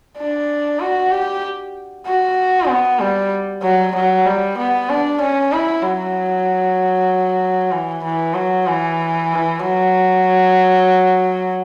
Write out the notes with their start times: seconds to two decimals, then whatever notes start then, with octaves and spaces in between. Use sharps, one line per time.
0.17 D4
0.79 F#4
1.11 G4
2.06 F#4
2.69 B3
3.00 G3
3.63 F#3
3.95 F#3
4.25 G3
4.58 B3
4.89 D4
5.21 C#4
5.52 E4
5.82 F#3
7.71 E3
8.03 E3
8.34 F#3
8.66 E3
9.60 F#3